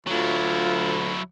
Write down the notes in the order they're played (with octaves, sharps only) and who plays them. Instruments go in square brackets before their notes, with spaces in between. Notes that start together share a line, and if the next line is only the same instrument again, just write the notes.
[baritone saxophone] D2 [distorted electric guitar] F#3 E4 [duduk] F4